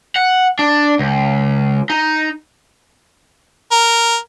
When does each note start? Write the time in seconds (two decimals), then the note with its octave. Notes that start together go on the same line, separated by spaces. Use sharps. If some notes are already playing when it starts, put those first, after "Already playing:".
0.16 F#5
0.59 D4
0.99 C#2
1.90 D#4
3.72 A#4